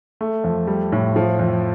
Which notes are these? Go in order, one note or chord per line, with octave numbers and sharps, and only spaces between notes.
A3
F2
G3
A2
F3
F2